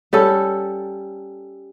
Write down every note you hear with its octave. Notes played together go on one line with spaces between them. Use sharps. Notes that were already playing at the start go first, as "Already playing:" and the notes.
G3 C#4 A4